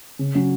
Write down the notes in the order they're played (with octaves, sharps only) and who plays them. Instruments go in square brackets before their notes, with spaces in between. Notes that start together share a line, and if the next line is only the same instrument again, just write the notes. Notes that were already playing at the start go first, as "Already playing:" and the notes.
[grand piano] C#3
F#3 C#4 F#4